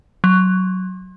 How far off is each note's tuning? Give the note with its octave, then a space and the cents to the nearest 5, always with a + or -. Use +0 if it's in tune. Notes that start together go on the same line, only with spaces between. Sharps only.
F#3 +10